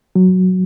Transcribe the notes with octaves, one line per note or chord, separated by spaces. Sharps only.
F#3